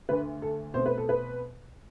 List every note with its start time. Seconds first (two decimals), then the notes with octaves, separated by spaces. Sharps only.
0.09 D2 D3 A3 B4
0.42 A4
0.74 B2 A3 C4 C5
0.86 B4
0.98 A4
1.09 B4